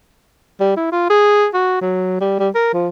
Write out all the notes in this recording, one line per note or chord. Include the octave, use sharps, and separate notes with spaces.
G3
E4
F4
G#4
F#4
F#3
G3
G3
A#4
F3